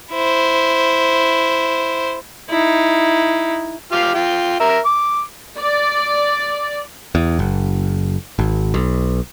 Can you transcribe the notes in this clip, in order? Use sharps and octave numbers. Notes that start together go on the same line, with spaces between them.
E4 C5
D#4 E4
F4 G4 F5
F4 G5
A#4 E5
D6
D5
E2
F#1
G#1
B1